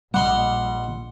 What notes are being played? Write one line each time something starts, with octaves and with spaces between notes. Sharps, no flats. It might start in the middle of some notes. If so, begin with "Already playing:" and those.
A#1 G3 D#5 F#5 C6